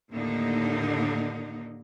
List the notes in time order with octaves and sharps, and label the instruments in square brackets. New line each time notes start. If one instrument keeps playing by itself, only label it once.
[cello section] D#2 A2 D3 A#3 D#4